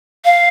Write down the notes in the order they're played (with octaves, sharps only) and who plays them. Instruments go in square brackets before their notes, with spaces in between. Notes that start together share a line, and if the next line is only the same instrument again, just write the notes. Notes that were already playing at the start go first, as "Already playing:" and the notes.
[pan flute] F5